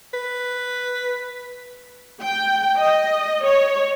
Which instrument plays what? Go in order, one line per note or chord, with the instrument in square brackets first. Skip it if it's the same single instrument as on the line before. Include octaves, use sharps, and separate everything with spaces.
[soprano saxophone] B4
[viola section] G5
D#5
C#5